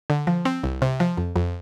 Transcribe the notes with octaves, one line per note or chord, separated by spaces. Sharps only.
D3
F3
C4
C2
C3
F3
F2
F2